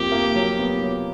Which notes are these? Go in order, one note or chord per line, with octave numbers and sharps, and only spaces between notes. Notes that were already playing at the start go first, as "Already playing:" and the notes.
Already playing: F2 A#3 G4
A#3
F#3
B3
F#3